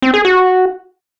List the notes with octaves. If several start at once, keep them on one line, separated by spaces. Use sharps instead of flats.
C4
G#4
F#4